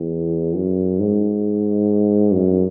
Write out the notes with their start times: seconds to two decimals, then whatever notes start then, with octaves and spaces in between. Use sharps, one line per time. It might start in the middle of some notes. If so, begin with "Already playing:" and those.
Already playing: E2
0.55 F#2
0.99 G#2
2.32 F#2